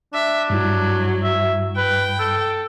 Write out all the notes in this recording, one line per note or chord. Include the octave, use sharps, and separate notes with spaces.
D4 E5
G2 F#3 G3 E4
E5
B4 G5
A4